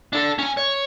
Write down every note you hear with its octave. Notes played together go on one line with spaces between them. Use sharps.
D4 A4
C#4 G#5
C#5